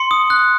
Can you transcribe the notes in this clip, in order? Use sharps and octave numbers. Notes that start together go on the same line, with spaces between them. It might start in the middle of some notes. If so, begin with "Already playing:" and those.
Already playing: C6 C#7
D#6
F#6